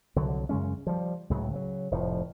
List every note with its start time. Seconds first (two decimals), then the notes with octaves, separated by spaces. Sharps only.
0.16 C2 D3 F#3
0.49 F#2 C#3 G#3 C#4
0.87 F3 G3
1.30 C#2 A2 C#3 F#3
1.51 C#3 F3 F#3
1.91 F1 A2 F3